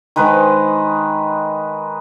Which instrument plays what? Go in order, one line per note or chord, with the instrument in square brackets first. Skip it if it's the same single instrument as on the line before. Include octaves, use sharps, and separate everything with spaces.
[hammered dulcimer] D#3 G#3 B4 C5